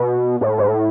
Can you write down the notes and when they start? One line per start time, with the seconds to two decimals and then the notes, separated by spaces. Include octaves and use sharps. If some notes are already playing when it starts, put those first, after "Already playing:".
Already playing: B2
0.41 A2
0.58 G#2
0.68 A2